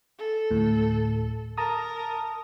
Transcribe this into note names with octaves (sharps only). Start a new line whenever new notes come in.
A4
D2 A2
A#4 A5 A#5 D#6